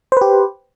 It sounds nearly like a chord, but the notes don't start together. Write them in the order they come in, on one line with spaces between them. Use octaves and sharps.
C5 B4 G4